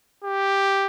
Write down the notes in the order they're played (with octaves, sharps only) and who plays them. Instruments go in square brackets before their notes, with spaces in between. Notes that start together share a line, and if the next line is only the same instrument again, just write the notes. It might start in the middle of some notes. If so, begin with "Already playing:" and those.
[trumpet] G4